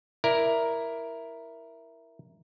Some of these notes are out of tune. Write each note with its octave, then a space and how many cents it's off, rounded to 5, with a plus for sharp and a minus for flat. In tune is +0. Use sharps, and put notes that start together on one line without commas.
E4 +0 A#4 +5 D5 +0